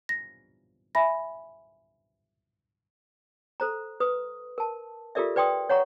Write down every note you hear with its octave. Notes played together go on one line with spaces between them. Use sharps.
A#6
E5 G#5 B5 A#6
A4 C5 A#5
B4 D#6
A#4 A5
F4 G4 A4 A#4 D5 E5
B4 D5 G5 C6 D#6
C#5 F#5 A#5 C#6